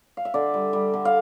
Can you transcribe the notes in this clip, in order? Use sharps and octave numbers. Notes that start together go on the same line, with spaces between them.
F5
E5
D3 D5
G3
G3
D3
F5